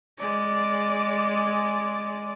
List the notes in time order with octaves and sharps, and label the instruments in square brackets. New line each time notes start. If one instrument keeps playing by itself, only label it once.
[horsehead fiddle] G#3 D5